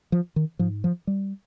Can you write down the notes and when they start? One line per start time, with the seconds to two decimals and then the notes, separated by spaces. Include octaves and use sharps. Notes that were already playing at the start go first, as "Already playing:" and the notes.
0.12 F3
0.36 D#3
0.59 G#2 F3
0.84 F3
1.07 G3